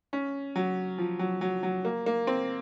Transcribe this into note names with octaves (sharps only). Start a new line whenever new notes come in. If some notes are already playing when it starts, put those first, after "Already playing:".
C#4
F#3
F3
F#3
F#3
F#3
A#3
A#3
C4